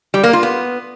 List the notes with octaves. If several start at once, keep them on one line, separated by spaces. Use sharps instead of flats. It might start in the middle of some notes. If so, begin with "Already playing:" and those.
G3
A#3
F4
B3